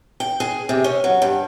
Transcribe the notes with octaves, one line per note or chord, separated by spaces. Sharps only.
G5
G#4
C3
C#4
F#3
G2